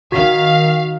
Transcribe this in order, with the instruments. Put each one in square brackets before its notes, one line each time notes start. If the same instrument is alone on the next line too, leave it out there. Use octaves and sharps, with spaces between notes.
[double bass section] D#3 [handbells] F#4 B6 [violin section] F5